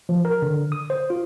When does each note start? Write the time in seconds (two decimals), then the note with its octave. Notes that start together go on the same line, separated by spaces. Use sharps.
0.09 F3
0.25 A#4
0.42 D3
0.72 D#6
0.90 C5
1.10 F4